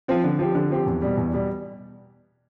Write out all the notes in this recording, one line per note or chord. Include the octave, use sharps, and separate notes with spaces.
F3 C4 F4
D3
F3 C4 G4
D3
F3 C4 G4
E2
B2 G3
E2
B2 G3